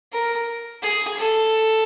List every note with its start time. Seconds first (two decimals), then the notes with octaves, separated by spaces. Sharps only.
0.13 A#4
0.82 G#4
1.16 A4